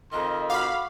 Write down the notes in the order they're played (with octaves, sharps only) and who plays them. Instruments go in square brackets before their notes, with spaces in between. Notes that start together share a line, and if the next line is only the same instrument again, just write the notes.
[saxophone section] F2 D#3 [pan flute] D#5 [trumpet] C6
[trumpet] F#4 [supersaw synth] F5 B5 [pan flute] D6